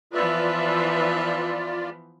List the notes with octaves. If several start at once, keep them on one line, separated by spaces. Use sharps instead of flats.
E3 F3 B3 F4 B4 D5 E5